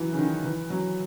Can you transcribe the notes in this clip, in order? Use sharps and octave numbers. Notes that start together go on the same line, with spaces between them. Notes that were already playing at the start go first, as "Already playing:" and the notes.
Already playing: E3 F#3
C#3
D#3
E3
F#3